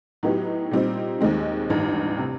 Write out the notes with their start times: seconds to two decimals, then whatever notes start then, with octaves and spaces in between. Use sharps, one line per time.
0.23 A2 F#3 B3 D#4 G4
0.71 A#2 G3 C4 D#4
1.21 D#2 D#3 G#3 C4
1.70 A1 G2 D#3
2.18 C3